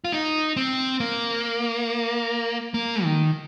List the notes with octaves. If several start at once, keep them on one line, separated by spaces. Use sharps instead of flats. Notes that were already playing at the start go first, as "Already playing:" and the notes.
F4
D#4
C4
A#3
A#3
D#3